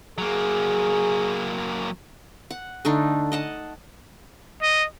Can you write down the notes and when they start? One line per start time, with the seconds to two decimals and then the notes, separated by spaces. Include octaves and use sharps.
0.18 F#3 A#3 G#4
2.50 F#5
2.85 D3 A3 D4 D#4
3.32 D#5 F#5 A5
4.62 D#5